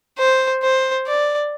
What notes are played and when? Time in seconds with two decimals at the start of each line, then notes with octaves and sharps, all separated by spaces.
0.19 C5
0.63 C5
1.07 D5